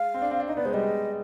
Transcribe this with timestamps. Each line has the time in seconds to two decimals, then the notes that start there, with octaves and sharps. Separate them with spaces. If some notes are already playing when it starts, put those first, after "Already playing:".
Already playing: G#3 F5
0.14 C4
0.22 D4
0.31 C4
0.40 D4
0.48 D#4 D#5
0.56 B3 D5
0.65 G#3 C5
0.74 G3 D#5
0.82 G#3